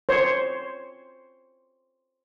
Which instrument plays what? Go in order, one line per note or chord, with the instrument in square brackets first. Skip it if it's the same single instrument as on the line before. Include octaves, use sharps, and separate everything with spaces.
[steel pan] C5 C#5